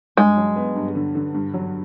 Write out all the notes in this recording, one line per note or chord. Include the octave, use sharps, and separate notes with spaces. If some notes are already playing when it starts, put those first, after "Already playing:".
G2 G#3
F#3
B3
G2
D3
D3
G2
F#3